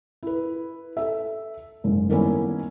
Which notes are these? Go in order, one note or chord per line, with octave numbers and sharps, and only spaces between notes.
E4 B4
A4 E5
F#1 G#2
D#3 G3 A#3 B3 C#4 E4